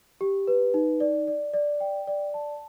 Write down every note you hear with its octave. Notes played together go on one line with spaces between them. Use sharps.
G4
B4
D#4
D5
D5
D5
G5
D5
A5